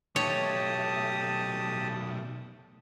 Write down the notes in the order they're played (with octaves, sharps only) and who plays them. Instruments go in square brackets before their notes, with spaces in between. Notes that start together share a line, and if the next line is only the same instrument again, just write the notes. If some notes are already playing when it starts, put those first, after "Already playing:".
[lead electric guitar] B1 A3 [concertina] G4 A5 D#6 [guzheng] C#5